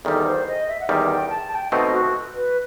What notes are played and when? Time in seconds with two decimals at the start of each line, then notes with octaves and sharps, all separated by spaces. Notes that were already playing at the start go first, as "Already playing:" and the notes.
0.05 E2 D#3 G3 A4
0.25 C5
0.47 D#5
0.68 E5
0.80 F#5
0.89 E2 D#3 G3 G5
1.10 G5
1.30 A5
1.51 A5
1.55 G5
1.72 B2 A3 C4 D#4 D#5
1.92 F#4
2.35 B4